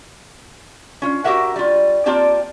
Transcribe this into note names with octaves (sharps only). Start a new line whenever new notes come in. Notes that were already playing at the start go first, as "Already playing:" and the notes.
C#4 F4
F#4 G4 A#4 E5 F#5
G3 F4
A#3 C4 F4 G4 D5 A5